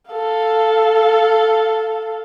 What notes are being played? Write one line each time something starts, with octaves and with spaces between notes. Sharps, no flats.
A4 F5